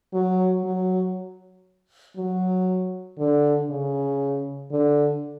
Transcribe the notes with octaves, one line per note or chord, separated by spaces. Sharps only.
F#3
F#3
F#3
D3
C#3
D3